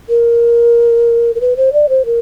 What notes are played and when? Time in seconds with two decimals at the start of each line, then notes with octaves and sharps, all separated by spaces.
0.09 A#4
1.35 A#4
1.41 B4
1.57 C5
1.73 D5
1.89 C5
2.05 A#4